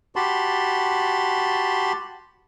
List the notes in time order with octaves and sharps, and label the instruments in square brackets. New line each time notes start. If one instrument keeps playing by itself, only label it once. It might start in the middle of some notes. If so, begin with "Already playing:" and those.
[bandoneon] F#4 G4 A5 B5 C6